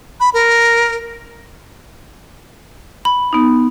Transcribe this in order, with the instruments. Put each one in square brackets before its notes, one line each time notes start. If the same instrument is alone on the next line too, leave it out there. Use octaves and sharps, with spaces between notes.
[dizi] B5
A#4
[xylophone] B5
[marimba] B3 D#4